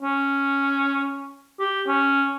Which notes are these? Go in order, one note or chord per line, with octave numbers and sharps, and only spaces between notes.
C#4
G4
C#4